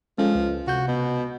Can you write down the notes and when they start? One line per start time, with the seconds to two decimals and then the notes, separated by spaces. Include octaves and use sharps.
0.18 F3 G#3 C#4 A4
0.35 C#2
0.67 C3 F#4 G6
0.88 B2